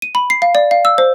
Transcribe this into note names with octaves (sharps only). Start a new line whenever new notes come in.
D#7
B5
C7
F5
D5
F5
E6
C5